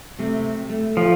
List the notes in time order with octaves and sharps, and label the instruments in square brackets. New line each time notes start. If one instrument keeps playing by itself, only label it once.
[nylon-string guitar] C3 A3 C4
A3
[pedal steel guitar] F3